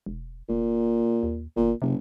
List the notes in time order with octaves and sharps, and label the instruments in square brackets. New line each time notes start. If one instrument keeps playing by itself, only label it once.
[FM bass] E1
[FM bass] F1 [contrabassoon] A#2
[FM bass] D#2
[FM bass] G1 [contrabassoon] A#2
[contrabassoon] F#1 [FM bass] C3